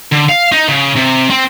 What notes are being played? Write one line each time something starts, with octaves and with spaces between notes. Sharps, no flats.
D3
F5
D#4
C#3
C3
C4